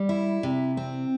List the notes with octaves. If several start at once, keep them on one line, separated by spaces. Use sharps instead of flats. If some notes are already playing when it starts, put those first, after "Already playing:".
Already playing: G3
E4
C3
C4